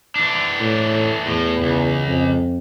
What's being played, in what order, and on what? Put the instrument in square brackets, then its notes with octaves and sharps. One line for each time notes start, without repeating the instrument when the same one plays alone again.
[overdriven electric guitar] E3 D4
[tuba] A2
[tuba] E2 [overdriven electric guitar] A2
[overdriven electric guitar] C#2
[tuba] F2